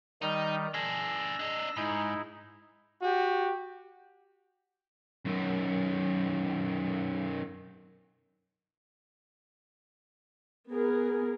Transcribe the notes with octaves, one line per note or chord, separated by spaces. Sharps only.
D#3 G3 D#4
D4 G#4 E6 A#6
D4 D#5
G#2 D#4 E4
F#4 G4
F#2 D#3
B3 G#4 A#4